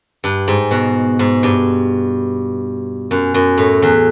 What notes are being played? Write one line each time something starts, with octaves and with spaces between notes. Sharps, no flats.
G2
G#2
B2
G#2
G2
F#2
F#2
A2
E2